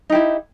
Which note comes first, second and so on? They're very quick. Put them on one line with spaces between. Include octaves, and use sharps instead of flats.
D#4 G4 E4